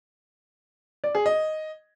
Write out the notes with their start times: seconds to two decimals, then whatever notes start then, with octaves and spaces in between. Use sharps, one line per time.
1.04 D5
1.15 G#4
1.26 D#5